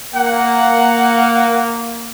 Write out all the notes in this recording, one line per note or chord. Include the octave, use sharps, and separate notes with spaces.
A#3 F#5